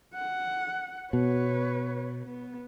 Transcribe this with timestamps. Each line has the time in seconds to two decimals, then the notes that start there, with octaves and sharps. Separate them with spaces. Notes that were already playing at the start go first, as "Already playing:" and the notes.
0.14 F#5
1.13 B2 B4 C#5
2.25 B3